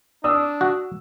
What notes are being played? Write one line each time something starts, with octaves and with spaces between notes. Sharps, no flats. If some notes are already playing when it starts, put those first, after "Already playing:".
D4 D5 D#6 E6
F#4